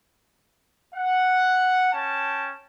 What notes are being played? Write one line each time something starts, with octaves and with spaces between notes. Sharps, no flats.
F#5
C#4 G5 A5